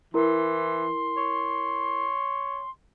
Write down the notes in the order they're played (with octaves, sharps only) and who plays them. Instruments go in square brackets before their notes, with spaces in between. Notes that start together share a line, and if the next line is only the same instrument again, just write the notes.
[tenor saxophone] E3 [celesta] E4 A#4 [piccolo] C6
[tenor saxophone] C#5